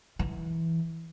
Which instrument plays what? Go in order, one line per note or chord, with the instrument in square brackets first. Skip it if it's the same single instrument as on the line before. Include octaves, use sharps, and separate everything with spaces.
[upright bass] E3